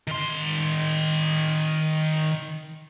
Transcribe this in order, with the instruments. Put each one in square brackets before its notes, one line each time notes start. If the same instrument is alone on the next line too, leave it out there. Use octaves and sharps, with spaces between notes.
[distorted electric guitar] D#3 C6